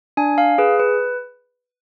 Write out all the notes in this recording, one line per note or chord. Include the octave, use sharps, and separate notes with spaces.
D4 G#5
F5
G#4 B4
B4